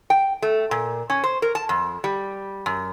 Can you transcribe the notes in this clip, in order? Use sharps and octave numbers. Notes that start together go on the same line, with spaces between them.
G5
A3
A#2
C#4
C5
A#4
A5
F2
G3
F#2